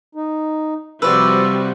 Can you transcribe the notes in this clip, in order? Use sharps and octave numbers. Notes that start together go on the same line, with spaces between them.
D#4
C3 F3 G3 F#4 B4 D5 E6